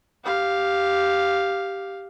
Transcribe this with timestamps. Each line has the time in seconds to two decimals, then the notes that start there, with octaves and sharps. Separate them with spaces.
0.24 G4 F5